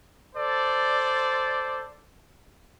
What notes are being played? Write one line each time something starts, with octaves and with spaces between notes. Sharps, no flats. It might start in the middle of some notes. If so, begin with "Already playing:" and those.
A4 C5 D5